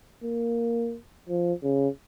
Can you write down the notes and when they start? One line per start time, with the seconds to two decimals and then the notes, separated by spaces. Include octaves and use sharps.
0.23 A#3
1.29 F3
1.64 C#3